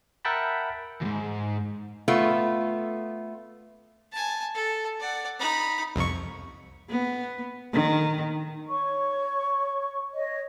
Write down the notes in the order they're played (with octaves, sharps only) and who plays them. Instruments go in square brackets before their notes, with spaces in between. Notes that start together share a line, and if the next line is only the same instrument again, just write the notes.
[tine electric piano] A#4 E5 F#5 G5 A5 B5
[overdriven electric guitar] D#2 G#2
[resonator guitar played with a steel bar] A3 B3 F4
[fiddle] G#5 A5
A4
D5 F#5
D#4 B5
[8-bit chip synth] C2 F2 C#6
[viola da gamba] B3
D#3
[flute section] C#5 C#6
C#5 D#5